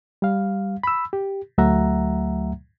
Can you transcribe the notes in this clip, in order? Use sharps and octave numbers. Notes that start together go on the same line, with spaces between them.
G3 F5
B5 E6
G4
D2 F#3 A3 E5 F#5 A#5